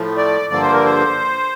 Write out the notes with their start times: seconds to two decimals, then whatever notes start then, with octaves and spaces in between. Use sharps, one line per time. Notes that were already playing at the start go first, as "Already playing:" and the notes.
Already playing: A2 F3 A3
0.17 D5
0.50 G2 D3 F3 A#3 D5
0.62 C5
0.73 A#4
0.85 C5